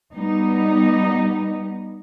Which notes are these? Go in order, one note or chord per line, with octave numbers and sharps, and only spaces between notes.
G3 B3 D#4